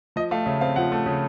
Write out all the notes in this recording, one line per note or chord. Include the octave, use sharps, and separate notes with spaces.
F3 D#5
A3 F5
C#3 E5
C4 F5
F3 F#5
A3
C#3